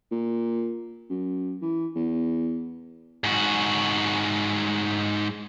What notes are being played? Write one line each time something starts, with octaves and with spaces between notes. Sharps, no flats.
A#2
F#2
E3
E2
G#2 F#4